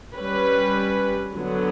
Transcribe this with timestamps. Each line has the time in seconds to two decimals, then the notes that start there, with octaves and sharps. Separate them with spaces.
0.14 G3 C#4 G4 B4
1.36 D3 F#3 B3